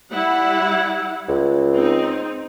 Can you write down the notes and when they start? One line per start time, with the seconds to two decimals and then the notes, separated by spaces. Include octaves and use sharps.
0.11 G3 E4 F#5
1.29 C#2
1.74 C4 D#4